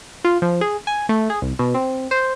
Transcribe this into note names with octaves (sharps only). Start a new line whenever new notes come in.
F4
F3
G#4
G#5
A3
G#4
C2
B2
C4
C5